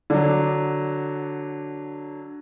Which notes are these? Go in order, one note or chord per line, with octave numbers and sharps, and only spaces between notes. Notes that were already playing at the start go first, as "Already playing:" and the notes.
D3 F#3